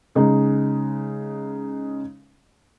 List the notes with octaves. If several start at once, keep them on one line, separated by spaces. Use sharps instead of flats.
C#3 G#3 D#4